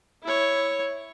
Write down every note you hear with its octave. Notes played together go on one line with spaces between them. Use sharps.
E4 C#5